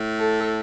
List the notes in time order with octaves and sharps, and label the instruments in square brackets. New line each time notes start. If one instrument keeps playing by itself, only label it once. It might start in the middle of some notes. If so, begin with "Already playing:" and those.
Already playing: [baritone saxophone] A2
[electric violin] A4